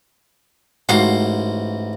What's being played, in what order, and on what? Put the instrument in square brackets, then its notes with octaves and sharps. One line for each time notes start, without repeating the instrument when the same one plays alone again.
[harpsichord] A1 F#4 C5 [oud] G#2 F5